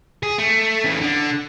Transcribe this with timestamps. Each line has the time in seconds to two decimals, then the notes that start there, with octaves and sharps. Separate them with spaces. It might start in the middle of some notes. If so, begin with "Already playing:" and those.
0.23 G#4
0.38 A3
0.84 C#3 E3
1.01 D3